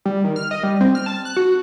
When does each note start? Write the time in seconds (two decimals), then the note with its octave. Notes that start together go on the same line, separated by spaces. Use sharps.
0.05 G3
0.24 D#3
0.36 F6
0.51 D#5
0.63 G3
0.81 C4
0.95 F6
1.06 A5
1.25 F#6
1.37 F#4